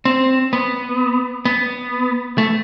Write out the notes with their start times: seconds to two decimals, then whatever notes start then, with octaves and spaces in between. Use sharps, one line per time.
0.05 C4
0.53 B3
1.45 B3
2.38 A3